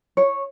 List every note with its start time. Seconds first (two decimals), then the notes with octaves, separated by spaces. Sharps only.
0.17 C#5